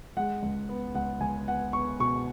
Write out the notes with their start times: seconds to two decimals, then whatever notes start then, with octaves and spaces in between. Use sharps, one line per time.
0.17 G#3 F#5
0.43 C#2
0.69 B3
0.95 C#2 F#5
1.21 C#2 G#5
1.47 B3 F#5
1.73 B3 C#6
2.00 B2 C#6